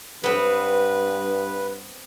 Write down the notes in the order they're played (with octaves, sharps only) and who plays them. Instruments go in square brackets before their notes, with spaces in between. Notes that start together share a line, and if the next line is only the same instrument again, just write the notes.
[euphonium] G2 [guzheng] B3 C4 [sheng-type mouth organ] B4